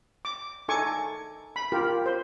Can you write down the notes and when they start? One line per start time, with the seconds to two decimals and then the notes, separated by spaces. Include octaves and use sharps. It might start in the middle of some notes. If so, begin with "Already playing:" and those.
0.25 D6
0.68 D#4 A4 G#5 C#6 D6
1.56 B5
1.72 F4 G4 A#4
2.06 C5